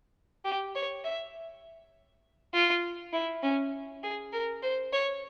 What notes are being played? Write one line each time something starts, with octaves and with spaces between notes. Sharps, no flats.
G4
C#5
E5
F4
E4
C#4
G#4
A#4
C5
C#5